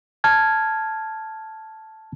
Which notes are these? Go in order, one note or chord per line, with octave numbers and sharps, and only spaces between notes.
A5 F6 G#6